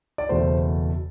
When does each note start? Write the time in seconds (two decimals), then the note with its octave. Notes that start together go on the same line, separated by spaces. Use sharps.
0.18 D5
0.29 F#1 E2 B2 A3 C5